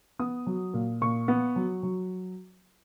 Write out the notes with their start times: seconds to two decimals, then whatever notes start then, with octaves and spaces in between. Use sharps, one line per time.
0.19 B3 D#6
0.47 F#3
0.74 A#2
1.01 A#2 C#6
1.28 B3
1.56 F#3
1.83 F#3